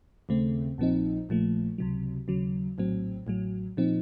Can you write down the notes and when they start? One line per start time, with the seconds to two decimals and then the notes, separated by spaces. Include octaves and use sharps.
0.29 D#2 C#3 A3 C4
0.78 A#1 A#2 F3 C4 D#4
1.29 A#1 A#2 F3 A3
1.78 C#2 C3 F#3
2.28 D#2 C#3 F#3
2.78 A#1 A2 F#3 C4
3.27 A1 A2 F#3
3.77 A#2 F3 C4 D#4